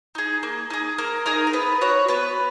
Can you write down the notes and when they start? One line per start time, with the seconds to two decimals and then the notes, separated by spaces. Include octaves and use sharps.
0.15 D#4 G#4
0.43 A#3
0.70 D#4 G#4
0.98 A#3 A#4
1.26 D#4 G#4 A#4
1.47 A#4
1.53 B3 B4
1.81 F#4 C#5
2.08 B3 B4